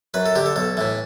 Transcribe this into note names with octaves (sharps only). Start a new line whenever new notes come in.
F#2 B4
A4
D3 G4
A4
B1 A4
A2 E3